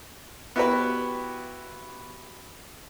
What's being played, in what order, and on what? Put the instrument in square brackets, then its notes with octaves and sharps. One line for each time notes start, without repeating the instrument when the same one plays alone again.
[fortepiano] B3 E4 F#4 G4 B4